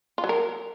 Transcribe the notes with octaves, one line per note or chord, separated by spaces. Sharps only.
F4
F#3
A#4